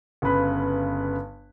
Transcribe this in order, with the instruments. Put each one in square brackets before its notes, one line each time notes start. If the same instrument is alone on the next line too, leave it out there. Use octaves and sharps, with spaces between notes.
[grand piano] G1 C#3 B4 B5